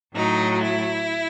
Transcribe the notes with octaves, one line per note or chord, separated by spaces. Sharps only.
A2 F#3 D#4
E4